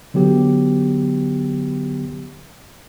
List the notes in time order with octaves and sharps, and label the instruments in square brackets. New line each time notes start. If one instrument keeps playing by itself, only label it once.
[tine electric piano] D3 F#3 B3 G4